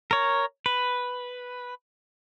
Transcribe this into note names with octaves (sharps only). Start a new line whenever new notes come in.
A#4 C#5
B4